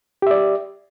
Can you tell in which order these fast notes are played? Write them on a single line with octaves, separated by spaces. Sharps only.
G4 E5 D5